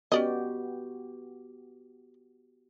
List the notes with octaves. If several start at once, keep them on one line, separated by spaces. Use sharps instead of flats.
B3 C#4 F#4 G4 D5 D#5